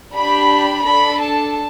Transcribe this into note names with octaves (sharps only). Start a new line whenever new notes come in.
D4 G4 B5
D4 A4 B5
A5